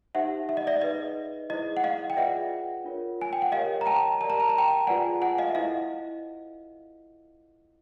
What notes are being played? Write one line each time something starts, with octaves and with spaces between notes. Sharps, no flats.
D#4 G4 C5 E5 F#5
E5
D#5
D5 E5
D#4 G#4 B4 D#5
E4 G#4 C5 D#5
F#5
D#5 F5
G5
F4 G#4 B4 D5 E5 F#5
D4 F4 A#4 C#5
G#5
G5
F#5
G4 A#4 C#5 D#5 F5
A#5
G5 A5
G4 A#4 D5 A5
A#5
A5
A#5
G5 A5
F4 G#4 B4 D5 F#5 G#5
F#5 G#5
D#5 F5
E5
E4 A4 C5 D#5 F5